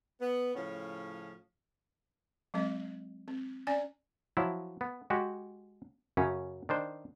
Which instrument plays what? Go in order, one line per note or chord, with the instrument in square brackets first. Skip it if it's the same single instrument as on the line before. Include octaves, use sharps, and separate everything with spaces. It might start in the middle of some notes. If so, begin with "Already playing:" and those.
[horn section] B3
A2 C#3 F3 C#4
[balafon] F#3 G#3 C4 D#5
C4
C#4 D5 G#5
[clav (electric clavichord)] F3 F#3 E4
B3
G#3 F#4 G4
F#2 C#3 C#4
D#3 D4 C5